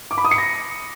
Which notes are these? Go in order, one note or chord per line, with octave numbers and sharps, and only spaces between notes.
D6
B5
D#6
C#7
A#6